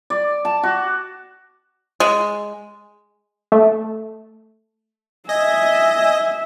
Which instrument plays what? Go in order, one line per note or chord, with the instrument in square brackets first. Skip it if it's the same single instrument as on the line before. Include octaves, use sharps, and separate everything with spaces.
[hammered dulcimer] D5
A5
F#4
[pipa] G#3
[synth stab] A3
[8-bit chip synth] D#5 [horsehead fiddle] E5 [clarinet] G#5